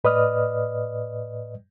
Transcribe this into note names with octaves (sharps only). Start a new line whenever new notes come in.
A2 B4 D5 D#5 D#6 F6